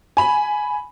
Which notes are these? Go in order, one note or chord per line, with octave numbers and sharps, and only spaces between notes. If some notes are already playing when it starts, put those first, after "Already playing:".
G#5 B5